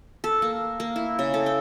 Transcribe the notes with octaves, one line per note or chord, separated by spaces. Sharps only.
A4
A#3
A#3
E4
C#3
A4
G5